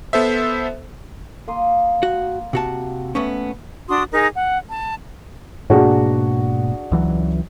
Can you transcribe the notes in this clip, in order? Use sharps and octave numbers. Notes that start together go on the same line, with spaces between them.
B3 A4 C5 E5
A#3 C6 D#6
F#4
C3 F#4 A5
A3 B3 C#4
D4 F#4 C6 D#6
D#4 G#4 A#4 A#5
F#5
A5
G#2 B2 A#3 D4 F#4 G#4
C#2 E3 F#3